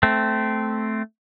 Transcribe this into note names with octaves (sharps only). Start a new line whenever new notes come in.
A3 C4